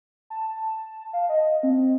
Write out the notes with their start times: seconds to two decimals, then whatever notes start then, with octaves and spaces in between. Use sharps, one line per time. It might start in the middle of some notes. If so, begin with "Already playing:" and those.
0.30 A5
1.13 F5
1.29 D#5
1.63 C4